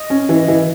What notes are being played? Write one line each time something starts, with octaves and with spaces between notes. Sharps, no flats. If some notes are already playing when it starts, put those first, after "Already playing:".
Already playing: D#5
C#4
E3
E3